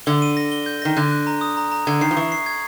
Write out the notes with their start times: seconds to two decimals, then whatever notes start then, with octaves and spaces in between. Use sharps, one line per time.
0.06 D3 G7
0.22 D#7
0.37 A#6
0.52 G7
0.66 G6
0.82 D#3 A#6
0.97 D3 F#6
1.12 F#6
1.27 A#5
1.41 D#6
1.57 A#5
1.72 A#5
1.87 D3 G#6
2.01 D#3 C7
2.11 F3
2.16 E3 C#6
2.32 C7
2.46 G#6